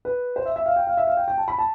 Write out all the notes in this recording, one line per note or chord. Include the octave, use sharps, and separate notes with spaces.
B4
C5
E5
E5
F5
G5
F5
E5
F5
G5
G5
A5
B5
A5